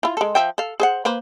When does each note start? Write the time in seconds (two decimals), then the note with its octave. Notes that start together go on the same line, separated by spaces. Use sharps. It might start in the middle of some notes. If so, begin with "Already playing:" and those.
0.03 E4 F4
0.17 G#3 A4
0.35 F3 E5 G5
0.58 A4 F5
0.80 G#4 C5 F#5
1.05 A#3 B4 C5